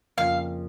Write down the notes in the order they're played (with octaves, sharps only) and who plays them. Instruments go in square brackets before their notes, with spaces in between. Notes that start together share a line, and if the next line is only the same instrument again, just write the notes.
[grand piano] F2 C#3 A#3 F4 [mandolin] F5